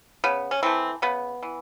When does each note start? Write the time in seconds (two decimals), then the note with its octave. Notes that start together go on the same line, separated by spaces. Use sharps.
0.24 C#3 B3
0.51 C#4
0.63 E3 A3 C4
1.02 C#3 B3
1.43 E3